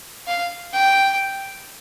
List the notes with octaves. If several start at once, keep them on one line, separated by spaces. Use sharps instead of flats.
F5
G5